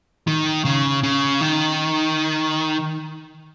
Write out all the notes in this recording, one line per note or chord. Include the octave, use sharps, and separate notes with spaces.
D#3
C#3
C#3
D#3